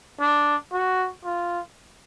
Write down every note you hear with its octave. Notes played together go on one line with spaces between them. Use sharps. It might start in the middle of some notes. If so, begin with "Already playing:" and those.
D4
F#4
F4